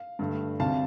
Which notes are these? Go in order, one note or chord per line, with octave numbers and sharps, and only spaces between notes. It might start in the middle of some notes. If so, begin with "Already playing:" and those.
Already playing: F5
G2 D3 A3
D2 C3 G3 F5 A5